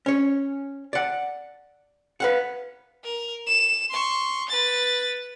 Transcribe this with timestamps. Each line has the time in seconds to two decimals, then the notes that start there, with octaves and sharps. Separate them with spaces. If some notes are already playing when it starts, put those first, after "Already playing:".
0.06 C#4 C#5
0.93 D5 F#5
2.20 B4 F5 F#5
3.04 A#4
3.47 E7
3.90 C6 C#6
4.49 B4 A6